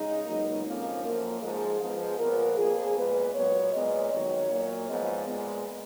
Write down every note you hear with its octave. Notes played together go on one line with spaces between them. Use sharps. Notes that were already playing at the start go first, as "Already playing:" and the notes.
Already playing: C#3 G#3 D#4
C#2 B2 F#3 A#3
F2 F3 A#3 C#4
F#2 F3 A#3 A#4
G#2 F3 G#3 G#4
G#2 F3 B3
A#2 F3 B3 A#4
F2 F3 A#3 G#4
A#2 G#3 B3 B4
A#2 F#3 B3 C#5
A#2 G#3 B3 D#5
F2 D#3 F#3 C#5
A#2 F#3 A#3
G#2 F3 G#3 B3 D#5
A#2 G#3 B3